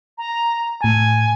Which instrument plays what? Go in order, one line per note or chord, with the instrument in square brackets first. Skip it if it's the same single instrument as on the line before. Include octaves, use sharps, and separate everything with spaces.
[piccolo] A#5
[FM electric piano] A2 A5 [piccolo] G#5